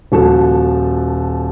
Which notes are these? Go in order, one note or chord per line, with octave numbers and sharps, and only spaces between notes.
D#1 F3 F#4 A4